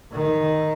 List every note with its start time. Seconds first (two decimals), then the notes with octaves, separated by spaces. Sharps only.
0.12 D#3